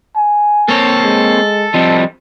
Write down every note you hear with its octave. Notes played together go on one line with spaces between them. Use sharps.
G#5
A#3 C4 A4 C#5
G#3
F3 G3 C4 D#5